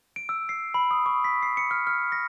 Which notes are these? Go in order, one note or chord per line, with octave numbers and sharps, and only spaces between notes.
D7
E6
C7
B5
D#6
C#6
B6
C7
C#7
F6
F6
A#6